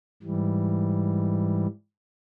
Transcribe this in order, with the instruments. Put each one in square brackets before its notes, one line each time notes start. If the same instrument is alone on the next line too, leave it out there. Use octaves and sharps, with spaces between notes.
[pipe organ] G#2 E3 G3